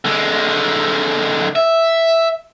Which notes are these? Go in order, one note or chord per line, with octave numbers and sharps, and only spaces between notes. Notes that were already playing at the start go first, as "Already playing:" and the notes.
D3 G#3
E5